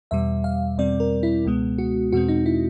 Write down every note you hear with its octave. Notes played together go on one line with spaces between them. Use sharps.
E2 B2 G3 E5
F5
E2 B2 G3 C4 D5
A#4
E4
C#2 B2 G#3 B3
F#4
E2 B2 G#3 C4 F#4
D#4
E4